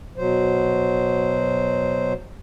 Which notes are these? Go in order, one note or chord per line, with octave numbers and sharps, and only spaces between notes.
B2 F#3 C5